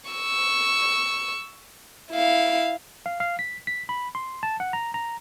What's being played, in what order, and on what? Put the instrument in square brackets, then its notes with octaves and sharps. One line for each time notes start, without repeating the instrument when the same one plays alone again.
[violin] C#6 E6
E4 F5
[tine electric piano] F5
F5
B6
B6
B5
C6
A5
F#5
A#5
A#5